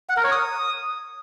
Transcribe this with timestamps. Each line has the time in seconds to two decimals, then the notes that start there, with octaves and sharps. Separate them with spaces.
0.09 F#5
0.17 A#4
0.24 C#5
0.32 D#6